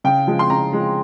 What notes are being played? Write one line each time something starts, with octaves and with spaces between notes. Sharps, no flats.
C#3 G5
F3 G#3
C6
C#3 A#5
F3 G#3